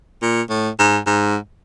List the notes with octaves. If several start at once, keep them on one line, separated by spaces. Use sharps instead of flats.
A#2
A2
G#2
G#2